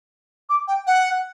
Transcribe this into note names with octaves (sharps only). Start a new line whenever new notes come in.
D6
G5
F#5